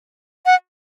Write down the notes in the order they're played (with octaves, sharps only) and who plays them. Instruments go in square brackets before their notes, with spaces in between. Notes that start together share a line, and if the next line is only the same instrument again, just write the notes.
[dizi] F#5